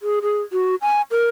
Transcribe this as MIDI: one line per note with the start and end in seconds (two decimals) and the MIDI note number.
0.01 0.20 68
0.22 0.41 68
0.52 0.75 66
0.82 1.02 80
1.11 1.29 70